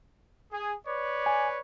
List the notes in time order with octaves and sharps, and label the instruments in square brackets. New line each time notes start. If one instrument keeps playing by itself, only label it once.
[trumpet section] G#4
B4 C#5 D5
[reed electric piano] G#5